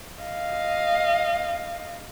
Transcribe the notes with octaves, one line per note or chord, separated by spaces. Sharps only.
D#5 F5